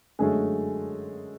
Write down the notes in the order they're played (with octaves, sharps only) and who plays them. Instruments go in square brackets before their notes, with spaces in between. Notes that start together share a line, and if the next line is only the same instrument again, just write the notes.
[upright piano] F#2 D3 F#3 G#3 A3 G#4